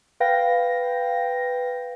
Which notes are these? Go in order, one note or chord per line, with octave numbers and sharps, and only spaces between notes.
B4 F5 G5 A#6